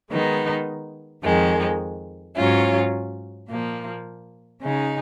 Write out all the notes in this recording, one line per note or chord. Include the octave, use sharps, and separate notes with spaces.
D#3 G#3 B3 D#4
F2 D#3 G#3
G#2 F#3 C#4 F4
A#2 F3 A#3
C#3 G#3 D#4